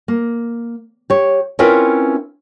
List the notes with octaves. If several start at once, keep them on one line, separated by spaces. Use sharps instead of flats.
A#3
G4 C#5
C4 C#4 E4 F4 A#4 B4